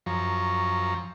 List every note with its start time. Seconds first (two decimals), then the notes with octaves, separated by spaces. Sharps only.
0.06 F#2 F3 A#5 C#6